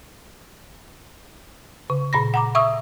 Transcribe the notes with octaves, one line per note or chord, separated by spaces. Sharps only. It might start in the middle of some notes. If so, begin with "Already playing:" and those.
C#3
A#2 B5 A#6
F#5 A#5 D6
E5 C#6 D#6 E6